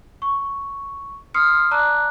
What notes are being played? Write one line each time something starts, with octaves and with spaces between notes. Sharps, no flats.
C#6
C6 D#6 F6 C7 C#7
D5 A5 A#5 D6 F#6